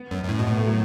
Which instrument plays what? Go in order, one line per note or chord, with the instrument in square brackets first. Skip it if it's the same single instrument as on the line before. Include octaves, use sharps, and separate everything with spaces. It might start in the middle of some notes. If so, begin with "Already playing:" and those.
Already playing: [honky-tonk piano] B3
[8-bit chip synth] F#2
F#2
A2
B2
[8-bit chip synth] A2 [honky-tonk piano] B3
[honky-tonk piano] A3
F#3